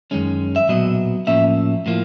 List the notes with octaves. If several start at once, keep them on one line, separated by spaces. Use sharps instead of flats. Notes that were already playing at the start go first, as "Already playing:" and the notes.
F#2 D#3 G#3 C#4
E5
B1 A#2 F#3 B3 D#5
A2 F3 A#3 C#4 E5
A2 F3 A#3